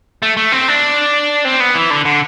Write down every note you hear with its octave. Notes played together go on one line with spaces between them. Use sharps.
A3
A3
C4
D4
C4
B3
E3
D3
D3